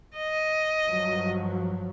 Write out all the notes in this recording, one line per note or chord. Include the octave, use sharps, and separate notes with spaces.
D#5
G2 F3 F#3